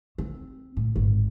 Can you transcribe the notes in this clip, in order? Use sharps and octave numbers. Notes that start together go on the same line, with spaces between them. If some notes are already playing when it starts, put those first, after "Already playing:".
C4
A2
G#1